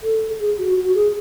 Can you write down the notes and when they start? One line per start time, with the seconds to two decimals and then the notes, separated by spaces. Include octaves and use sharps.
0.03 A4
0.40 G#4
0.58 F#4
0.76 F#4
0.94 G#4